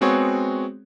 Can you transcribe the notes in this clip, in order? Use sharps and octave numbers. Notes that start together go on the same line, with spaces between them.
G#3 B3 C4 F#4 G#4 C#5